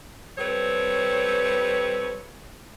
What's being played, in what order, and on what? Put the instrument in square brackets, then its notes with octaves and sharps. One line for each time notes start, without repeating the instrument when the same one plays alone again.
[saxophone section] G3 C4 A4 B4 C#5